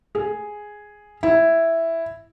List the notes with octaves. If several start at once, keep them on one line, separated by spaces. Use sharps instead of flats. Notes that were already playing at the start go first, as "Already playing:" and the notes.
G#4
E4